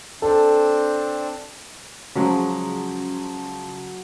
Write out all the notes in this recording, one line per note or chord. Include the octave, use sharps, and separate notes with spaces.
C4 D4 A4
C#3 F3 F#3 G#3